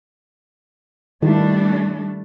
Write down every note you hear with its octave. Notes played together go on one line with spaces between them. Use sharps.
D#3 G3 A3 D4 E4